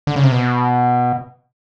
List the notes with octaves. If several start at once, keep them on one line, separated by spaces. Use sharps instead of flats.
D3
C#3
C3
B2